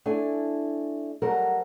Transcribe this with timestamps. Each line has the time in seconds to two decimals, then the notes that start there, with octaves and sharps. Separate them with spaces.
0.06 A3 D4 E4 G#5
1.22 F#3 G3 A3 A#4 C5 F#5